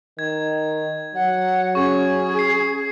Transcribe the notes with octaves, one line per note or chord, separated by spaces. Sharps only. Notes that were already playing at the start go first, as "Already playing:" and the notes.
D#3 G#6
F#3 F#5
C#4 G#4 C#6 G#6
C7